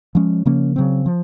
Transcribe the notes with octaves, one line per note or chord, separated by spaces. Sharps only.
F3 G#3 C#4
C#3 F3 A#3 C#4
C#3 F#3 C4
F3